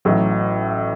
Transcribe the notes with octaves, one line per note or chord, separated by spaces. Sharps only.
A1 A2 F#3